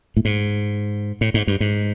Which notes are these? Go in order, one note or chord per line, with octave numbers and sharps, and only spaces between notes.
A2
G#2
A2
G#2
G2
G#2